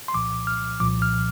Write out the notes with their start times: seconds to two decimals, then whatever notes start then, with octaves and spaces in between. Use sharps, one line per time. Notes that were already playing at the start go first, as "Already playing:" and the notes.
0.08 C6
0.14 C2 A#2 F3 D6
0.47 F6
0.80 C2 A#2 F3 D6
1.02 F6